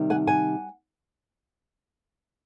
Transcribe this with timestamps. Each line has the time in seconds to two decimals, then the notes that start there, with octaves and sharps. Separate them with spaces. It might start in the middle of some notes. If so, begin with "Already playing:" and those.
Already playing: C3 D#3 G3 D#4
0.10 F#5 G#5
0.27 F#5 G#5